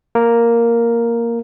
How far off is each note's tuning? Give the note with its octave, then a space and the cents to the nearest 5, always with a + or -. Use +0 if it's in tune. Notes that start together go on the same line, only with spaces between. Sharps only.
A#3 +0 A#4 +0